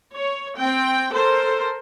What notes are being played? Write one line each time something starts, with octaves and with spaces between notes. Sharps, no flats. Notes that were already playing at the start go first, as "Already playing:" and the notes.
C#5
C4 G5
A4 A#4 C5